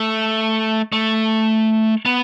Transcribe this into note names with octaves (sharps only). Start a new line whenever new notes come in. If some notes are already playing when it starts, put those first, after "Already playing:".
Already playing: A3
A3
B3